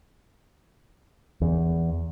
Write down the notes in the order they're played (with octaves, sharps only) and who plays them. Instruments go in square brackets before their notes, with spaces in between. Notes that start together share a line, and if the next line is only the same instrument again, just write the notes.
[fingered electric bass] E2